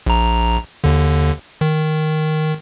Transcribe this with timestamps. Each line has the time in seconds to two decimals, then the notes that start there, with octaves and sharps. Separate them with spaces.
0.07 A#1 A#5
0.84 D#2 D3
1.61 D#3